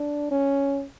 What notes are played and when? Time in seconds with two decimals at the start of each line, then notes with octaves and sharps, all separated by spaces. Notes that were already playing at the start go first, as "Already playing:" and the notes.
Already playing: D4
0.31 C#4